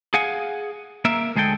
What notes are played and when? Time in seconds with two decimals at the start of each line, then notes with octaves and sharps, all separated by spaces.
0.14 G#4 F5 F#5 G#5
1.05 A#3 A#4 E5
1.36 D2 G#3 G#4 A4 G5